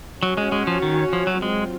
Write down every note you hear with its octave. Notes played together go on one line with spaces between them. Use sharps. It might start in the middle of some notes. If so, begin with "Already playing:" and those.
F#3 C#4 F#4 C#5
G#3
G#3
F3
D#3
F3
F#3
F#3 G#3 C4 F4